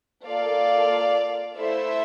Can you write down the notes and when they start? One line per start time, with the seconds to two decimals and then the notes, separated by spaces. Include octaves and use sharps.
0.25 A#3 F4 A4 D5 F5
1.57 A3 E4 A4 C5 E5